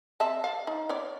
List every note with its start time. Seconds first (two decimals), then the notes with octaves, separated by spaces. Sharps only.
0.20 C4 E5 A5
0.44 D5 E5 F5
0.67 D#4
0.89 C#4 C#5 D5